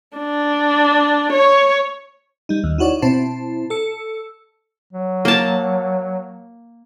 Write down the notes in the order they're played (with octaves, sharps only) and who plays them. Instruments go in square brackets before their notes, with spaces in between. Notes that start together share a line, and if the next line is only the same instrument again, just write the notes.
[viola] D4
C#5
[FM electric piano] G3 D#4
D#2
D#4 E4 F#4 C#5 D5
B2 C4 E4 C5 A5
A4 E6 C#7
[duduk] F#3
[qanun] A#3 A5